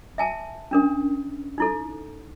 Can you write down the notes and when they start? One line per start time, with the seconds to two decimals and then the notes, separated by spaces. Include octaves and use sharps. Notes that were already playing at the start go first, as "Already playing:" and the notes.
0.18 E5 G#5 A5
0.71 C#4 D4 A#4
1.58 D#4 E4 A4